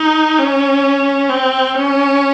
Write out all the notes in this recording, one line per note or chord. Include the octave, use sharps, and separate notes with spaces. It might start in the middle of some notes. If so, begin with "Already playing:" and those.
Already playing: D#4
C#4
C4
C#4